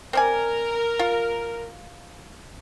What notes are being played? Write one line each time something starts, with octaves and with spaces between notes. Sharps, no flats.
C4 A#4 D5 G#5
F4